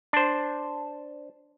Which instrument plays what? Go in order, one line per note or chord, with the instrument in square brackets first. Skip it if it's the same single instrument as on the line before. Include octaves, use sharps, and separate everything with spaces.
[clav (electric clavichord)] D4 C5